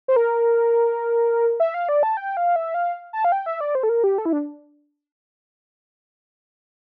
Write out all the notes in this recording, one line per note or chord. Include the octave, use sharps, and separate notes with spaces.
C5
A#4
E5
F5
D5
A5
G5
F5
E5
F5
A5
F5
G5
E5
D5
C5
A4
A#4
G4
A4
E4
D4